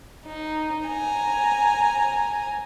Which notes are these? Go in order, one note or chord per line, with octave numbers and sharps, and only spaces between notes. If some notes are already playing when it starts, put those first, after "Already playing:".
D#4
G#5 A#5